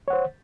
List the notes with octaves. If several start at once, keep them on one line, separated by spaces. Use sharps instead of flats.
C5 C#5 F#5